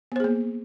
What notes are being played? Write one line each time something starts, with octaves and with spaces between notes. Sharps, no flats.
A#3 B3 G#4 C5